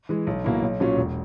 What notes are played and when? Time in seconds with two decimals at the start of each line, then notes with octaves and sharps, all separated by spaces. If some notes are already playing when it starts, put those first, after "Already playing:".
0.09 E3 G#3
0.27 B1
0.44 B2 A#3 E4
0.62 B1
0.80 A#2 F#3 C#4
0.97 E1